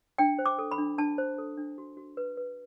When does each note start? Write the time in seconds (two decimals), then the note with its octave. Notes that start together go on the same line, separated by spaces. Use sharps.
0.18 D4 G5
0.39 C5
0.46 D6
0.59 A4
0.71 B5
0.78 D4
0.98 D4 A5
1.18 C5
1.38 A4
1.57 D4
1.78 F#4
1.97 F#4
2.17 B4
2.37 B4